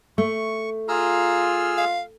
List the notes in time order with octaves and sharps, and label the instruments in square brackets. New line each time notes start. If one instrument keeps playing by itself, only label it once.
[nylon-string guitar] A3 [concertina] C#6
[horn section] F4 [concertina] G#4 E6 F6 [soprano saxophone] A#5
[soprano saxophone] F5